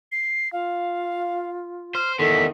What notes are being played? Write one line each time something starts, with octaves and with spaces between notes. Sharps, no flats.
C7
F4 F5
C5 F6
E2 D#3 A4 B6